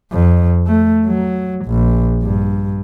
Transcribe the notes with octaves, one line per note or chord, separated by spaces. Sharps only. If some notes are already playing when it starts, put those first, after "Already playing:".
F2
A3
F#3
A#1
G2